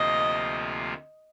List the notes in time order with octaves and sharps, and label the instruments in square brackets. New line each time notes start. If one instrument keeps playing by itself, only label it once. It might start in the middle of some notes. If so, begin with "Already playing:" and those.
Already playing: [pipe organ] D2 C3 F3 A#3 F4 [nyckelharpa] D#5